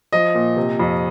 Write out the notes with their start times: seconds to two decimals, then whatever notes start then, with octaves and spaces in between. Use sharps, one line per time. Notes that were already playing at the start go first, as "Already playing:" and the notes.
0.12 F3 D#5
0.35 A#2
0.57 C3
0.80 F2